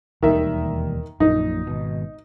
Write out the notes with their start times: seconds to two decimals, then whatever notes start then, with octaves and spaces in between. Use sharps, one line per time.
0.23 E1 D#2 D#3 G3 E5
1.20 A#1 F#2 A#2 D#4
1.67 G#1 B2